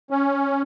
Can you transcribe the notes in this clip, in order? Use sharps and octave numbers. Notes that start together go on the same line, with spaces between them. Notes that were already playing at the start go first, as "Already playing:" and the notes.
C#4